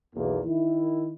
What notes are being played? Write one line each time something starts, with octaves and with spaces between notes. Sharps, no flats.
B1 E2 A#3
D#3 E4